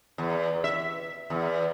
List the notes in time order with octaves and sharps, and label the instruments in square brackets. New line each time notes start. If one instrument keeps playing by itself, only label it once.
[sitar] E2
E5
E2